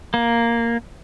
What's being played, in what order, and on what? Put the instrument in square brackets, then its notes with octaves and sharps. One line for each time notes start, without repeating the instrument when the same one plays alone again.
[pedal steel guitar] A#3